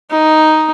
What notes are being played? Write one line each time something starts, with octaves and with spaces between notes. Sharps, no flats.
D#4